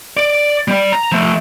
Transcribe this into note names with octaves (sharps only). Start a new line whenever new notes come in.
D5
G3 D5
A#5
F3 A3